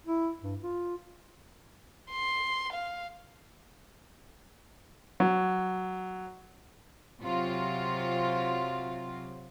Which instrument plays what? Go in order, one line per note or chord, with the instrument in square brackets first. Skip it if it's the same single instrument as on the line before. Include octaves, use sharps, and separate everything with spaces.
[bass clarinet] E4
G2
F4
[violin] C6
F5
[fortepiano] F#3
[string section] C3 F#3 F4